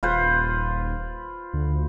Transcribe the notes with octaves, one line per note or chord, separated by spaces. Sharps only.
D#1 F4 B4 C5
D2